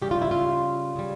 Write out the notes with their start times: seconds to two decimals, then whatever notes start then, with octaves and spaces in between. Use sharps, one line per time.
0.02 C#3 G3 G4
0.11 F4
0.22 E4
0.31 F4
0.96 C#3 G3